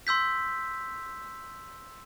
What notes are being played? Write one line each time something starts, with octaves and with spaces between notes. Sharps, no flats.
C6 E6 G6 B6